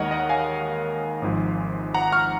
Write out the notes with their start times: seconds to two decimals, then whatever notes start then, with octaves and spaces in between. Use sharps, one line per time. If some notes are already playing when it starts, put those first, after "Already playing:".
Already playing: D#2 D#3 G#3 A#4 C#5 D#5 F#5
0.11 D#5 F#5
0.29 F5 G#5
1.22 G#1 G#2 F3 G#3
1.94 F#5 A#5
2.12 C#6 F6